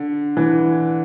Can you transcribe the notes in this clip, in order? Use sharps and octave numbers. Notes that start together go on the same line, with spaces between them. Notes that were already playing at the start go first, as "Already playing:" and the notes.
Already playing: D3
E3